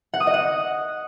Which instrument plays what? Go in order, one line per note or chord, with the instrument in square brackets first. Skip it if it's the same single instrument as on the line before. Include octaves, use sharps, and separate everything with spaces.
[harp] F#5
D#6
D#5
F#5